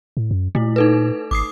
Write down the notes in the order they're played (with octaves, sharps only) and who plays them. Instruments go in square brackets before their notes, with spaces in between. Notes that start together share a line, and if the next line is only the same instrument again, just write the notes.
[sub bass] A2
F#2
[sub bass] A#2 [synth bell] A3 E4
[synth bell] D#4 A4 B4
[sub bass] G#1 [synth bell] D6 D#6 C7